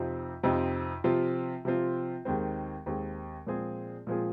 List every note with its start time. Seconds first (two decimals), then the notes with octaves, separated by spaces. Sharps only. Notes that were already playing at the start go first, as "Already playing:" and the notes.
Already playing: F2 C3 F3 C4 D#4
0.43 F2 C3 F3 C4 D#4
1.04 C3 F3 C4 F4
1.65 C3 F3 C4 F4
2.25 D#2 D#3 G#3 C4
2.86 D#2 D#3 G#3 C4
3.47 A#2 F3 G#3 C4 G#4
4.07 A#2 F3 G#3 C4 G#4